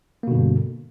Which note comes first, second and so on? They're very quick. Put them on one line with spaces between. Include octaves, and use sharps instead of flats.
A#3 B2 D3 G2